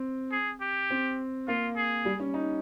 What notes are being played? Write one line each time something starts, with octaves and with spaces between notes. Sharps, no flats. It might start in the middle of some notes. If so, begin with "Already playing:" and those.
Already playing: C4
G#4
G4
C4
A#3 F4
G#4
G3
C#4
D#4